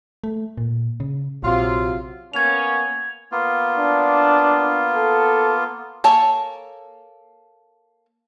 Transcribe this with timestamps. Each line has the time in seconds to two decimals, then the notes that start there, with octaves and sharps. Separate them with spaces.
0.24 A3
0.58 A#2
1.00 C#3
1.43 A#1 C3 F#3 F4
2.33 A#3 B3 C#4 G#6 F7
3.32 A#3 B3 F4
3.77 D4
4.95 A4
6.04 A#3 A4 C#5 G#5